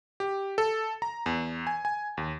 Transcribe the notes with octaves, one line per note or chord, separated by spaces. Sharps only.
G4
A4
A#5
E2
G#5
G#5
D#2